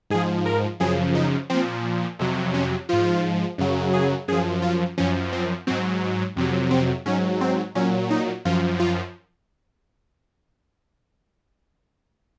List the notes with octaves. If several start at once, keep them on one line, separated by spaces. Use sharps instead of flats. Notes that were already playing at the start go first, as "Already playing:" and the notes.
G#2 F3 G#4
A#4
F#2 C#3 F3 G#4
D#4
A#2 F3 C4
F2 C3 F#3
C#4
G#2 F3 F4
F#2 C#3 F#3
G#4
F#2 F3 G#4
F4
F#2 F3 C#4
C4
G#2 F#3 C4
F2 C3 F#3
C4
G#2 F#3 C#4
C4
A#2 F#3 C#4
D#4
F#2 F3 F4
F4